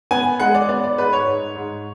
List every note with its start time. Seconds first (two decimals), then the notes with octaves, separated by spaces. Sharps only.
0.11 B3 G#5
0.40 G#3 F#5
0.55 D5
0.69 B3 D5
0.84 D5
0.98 G#2 B4
1.13 C#5
1.27 G#2
1.56 G#2